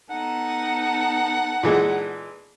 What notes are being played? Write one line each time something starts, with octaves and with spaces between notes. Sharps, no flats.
B3 D#4 A4 F#5
A#2 E3 G#3